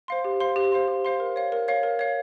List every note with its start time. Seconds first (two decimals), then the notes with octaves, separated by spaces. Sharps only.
0.08 C5 F5 C6
0.25 G4
0.40 C5 F5 C6
0.56 G4
0.72 C5 F5 C6
0.88 G4
1.05 C5 F5 C6
1.20 A#4
1.36 C#5 F5
1.52 A#4
1.68 C#5 F5
1.83 A#4
1.99 C#5 F5